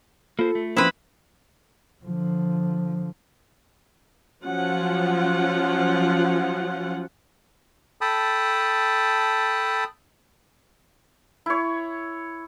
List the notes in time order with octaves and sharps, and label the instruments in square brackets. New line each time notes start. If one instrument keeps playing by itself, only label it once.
[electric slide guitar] A#3 C5 [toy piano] F4 [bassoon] A4
[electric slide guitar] A3
[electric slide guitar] F3 A#3 [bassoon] C4 [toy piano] C#4 C6 D#6 [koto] E4 B4
[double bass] D3 F3
[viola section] F3 F#3 C#4 F4 F#5
[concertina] A4 G5 A5 B5 D#6
[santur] E4 C#5